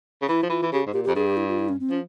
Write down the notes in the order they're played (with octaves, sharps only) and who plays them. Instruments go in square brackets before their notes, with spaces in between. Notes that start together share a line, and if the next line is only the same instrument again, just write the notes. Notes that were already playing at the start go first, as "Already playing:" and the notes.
[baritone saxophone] C#3
[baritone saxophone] E3 [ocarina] E4
[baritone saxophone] F3
[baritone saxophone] E3 [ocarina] F4
[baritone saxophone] E3
[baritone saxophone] C#3 [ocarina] G4
[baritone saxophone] G#2
[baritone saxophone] A#2 [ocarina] G4
[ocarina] G4
[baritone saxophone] F2
[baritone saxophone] G2 [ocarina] G#4
[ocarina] G4
E4
F4
E4
C#4
C4
[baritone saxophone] F3 [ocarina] C#4